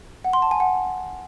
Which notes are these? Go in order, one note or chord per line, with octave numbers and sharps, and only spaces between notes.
F#5
C6
A5
G#5
F#5